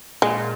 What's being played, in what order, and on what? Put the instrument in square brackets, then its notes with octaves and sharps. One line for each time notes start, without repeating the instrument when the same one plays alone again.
[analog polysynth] A#2 [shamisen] G#3